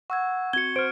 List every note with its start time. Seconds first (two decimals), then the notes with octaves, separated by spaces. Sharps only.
0.10 F#5 C#6 E6 G#6
0.53 C4 F#4 G#6 C#7 G7
0.76 C5 F6 D7